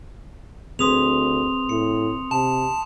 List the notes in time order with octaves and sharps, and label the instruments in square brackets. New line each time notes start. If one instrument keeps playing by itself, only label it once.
[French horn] D2 [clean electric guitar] C4 G#4 B4 [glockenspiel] C6 D#6 F7
[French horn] A2 [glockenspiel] C#7
[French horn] C3 [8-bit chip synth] A5